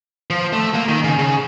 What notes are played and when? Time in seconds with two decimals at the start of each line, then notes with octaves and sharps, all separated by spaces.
0.30 F3
0.53 A3
0.74 A#3
0.89 D#3
1.04 C#3
1.19 C#3